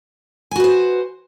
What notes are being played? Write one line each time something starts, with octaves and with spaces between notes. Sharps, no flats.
F#4 B4 C5 G#5